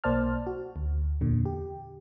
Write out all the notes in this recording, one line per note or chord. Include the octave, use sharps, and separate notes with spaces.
B1 A#3 C5 D5 A5 F6
F#4
D2
E2 A#2 D3
G4